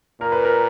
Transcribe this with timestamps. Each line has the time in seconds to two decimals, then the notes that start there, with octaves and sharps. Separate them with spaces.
0.20 A#2 A#4
0.32 B4
0.45 A#4